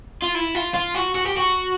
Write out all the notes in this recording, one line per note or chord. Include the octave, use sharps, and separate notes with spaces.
F4
E4
F4
F4
F#4
F#4
G4
F#4